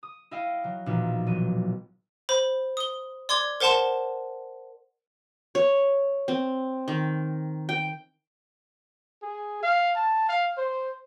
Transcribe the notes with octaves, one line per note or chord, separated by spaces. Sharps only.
D#6
E4 D#5 F5 G5
F#3
B1 A#2 E3 F3
E1 F#3 D#7
C5 B5
D#6 G7
D5 C6 D6 G#6
A#4 C5 F#5 A5 C6 E7
C#5
C4
D#3
G5
G#4
F5
A5
F5
C5